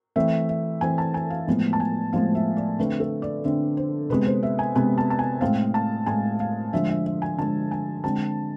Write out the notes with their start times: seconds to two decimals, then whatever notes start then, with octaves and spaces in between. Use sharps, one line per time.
0.16 E3 A3 C4 E5
0.49 E5
0.81 E3 A3 C4 G#5
0.98 A5
1.14 G#5
1.30 F5
1.48 A2 F3 G#3 B3
1.73 A5
1.80 G#5
2.13 A2 F3 G#3 B3 F5
2.35 E5
2.57 D5
2.79 D3 A3 C4 B4
3.00 A4
3.22 D5
3.44 D3 A3 C4 E5
3.77 C5
4.10 C3 G#3 B3 B4
4.26 C5
4.43 E5
4.59 G#5
4.75 C3 G#3 B3 G#5
4.98 A5
5.10 A5
5.19 G#5
5.41 A2 G#3 C4 F5
5.74 A5
6.06 A2 G#3 C4 G#5
6.40 F5
6.73 D3 F3 G#3 E5
6.90 E5
7.06 E5
7.22 G#5
7.38 D3 F3 G#3 A5
7.71 G#5
8.04 D3 G#3 C4 A5